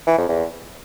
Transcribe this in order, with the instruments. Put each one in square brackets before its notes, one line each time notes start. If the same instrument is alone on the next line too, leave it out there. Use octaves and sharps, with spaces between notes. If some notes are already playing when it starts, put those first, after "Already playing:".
[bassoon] E3
F2
E2